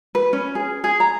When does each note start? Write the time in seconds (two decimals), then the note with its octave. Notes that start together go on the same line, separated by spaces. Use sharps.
0.15 B4
0.33 C#4
0.55 G#4
0.84 G#4
1.00 A#5